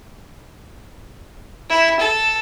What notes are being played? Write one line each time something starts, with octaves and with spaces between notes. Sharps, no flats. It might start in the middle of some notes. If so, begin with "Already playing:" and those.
E4
A4